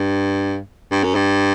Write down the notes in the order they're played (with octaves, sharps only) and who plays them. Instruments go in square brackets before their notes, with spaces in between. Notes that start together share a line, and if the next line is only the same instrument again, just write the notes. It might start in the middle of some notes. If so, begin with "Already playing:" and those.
Already playing: [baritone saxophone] G2
G2
F#2
G2